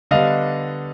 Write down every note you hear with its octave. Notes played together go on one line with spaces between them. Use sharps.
D3 G3 B3 D4 D#5 F5